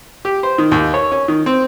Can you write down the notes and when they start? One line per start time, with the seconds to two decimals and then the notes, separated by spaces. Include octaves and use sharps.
0.25 G4
0.43 C5
0.58 D#3
0.72 D#2
0.94 C#5
1.12 C#4
1.28 D#3
1.46 C4